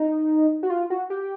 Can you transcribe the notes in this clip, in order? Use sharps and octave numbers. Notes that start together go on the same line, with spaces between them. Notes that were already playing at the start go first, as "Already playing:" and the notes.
Already playing: D#4
F#4
F4
F#4
G4